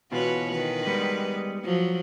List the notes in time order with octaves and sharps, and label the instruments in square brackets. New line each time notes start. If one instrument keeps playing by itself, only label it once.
[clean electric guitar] B2 E3 F4 [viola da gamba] F#4 B4 C#5
[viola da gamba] D#3 B4
[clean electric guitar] G3 G#3 B3
[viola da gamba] F3 F#3